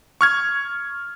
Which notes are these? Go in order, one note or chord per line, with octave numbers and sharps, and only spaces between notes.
C#6 F6 G#6